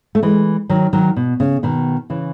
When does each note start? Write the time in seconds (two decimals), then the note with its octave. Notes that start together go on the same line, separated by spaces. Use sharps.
0.15 A3
0.23 E3 G#3
0.69 D#3 F#3
0.93 D#3 F#3
1.16 B2
1.40 C#3
1.63 B2 D#3
2.10 C#3 E3